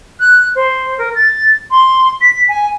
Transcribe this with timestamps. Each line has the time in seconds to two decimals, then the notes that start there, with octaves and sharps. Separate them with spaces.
0.20 F#6
0.55 C5
0.98 A#4
1.15 A6
1.71 C6
2.21 B6
2.48 G#5